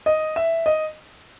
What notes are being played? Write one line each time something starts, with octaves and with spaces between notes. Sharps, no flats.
D#5
E5
D#5